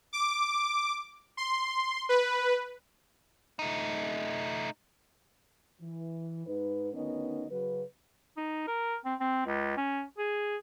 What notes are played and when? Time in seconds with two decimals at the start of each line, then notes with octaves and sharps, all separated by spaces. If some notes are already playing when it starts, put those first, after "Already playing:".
0.13 D6
1.37 C6
2.09 B4
3.59 A3 D#4
5.81 E3
6.46 G#2 D#4 B4
6.93 D2 D#3 B3 C#4 D#4 D#5
7.49 C#3 F#3 B4
8.37 D#4
8.68 A#4
9.05 C4
9.20 C4
9.46 C#2
9.77 C#4
10.18 G#4